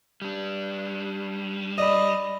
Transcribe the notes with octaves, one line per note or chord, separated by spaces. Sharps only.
G3 D4
D5 D#5 B5